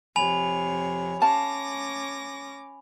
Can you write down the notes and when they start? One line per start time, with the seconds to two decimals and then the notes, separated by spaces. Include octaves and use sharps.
0.16 F2 C3 C#5 G#5 B5 F7
1.22 C#4 F5 A5 D6 A#6